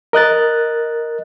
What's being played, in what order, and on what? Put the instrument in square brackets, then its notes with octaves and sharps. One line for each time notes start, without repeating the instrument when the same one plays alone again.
[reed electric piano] A#4 D#5 F#6 A6